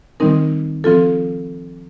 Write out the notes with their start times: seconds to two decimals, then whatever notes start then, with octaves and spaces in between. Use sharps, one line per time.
0.20 D#3 G3 C4 D#4 A#4
0.84 F3 C4 F4 A4